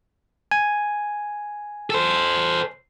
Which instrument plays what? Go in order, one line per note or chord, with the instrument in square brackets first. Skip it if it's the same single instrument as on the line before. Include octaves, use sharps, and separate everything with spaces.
[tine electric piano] G#5
[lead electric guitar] A4 C5